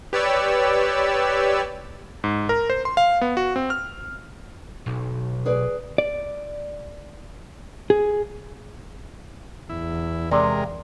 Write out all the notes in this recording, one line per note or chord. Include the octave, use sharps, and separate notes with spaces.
G4 B4 C#5 D5 E6
G#2
A#4
C5
C6
F5
B3
F#4
C4
F6
B1
G#4 B4 D5
D5
G#4
E2 E4
C3 G#3 A#4 D5